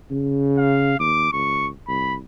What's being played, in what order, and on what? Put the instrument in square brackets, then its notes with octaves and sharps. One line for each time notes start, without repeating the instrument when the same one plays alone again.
[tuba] C#3
[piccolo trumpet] F5
[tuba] D#2 [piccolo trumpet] D6
[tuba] C#2 [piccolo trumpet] C#6
[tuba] C2 [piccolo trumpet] B5